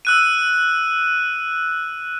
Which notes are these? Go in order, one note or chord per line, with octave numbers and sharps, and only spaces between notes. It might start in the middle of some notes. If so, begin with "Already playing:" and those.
E6 F#6 D#7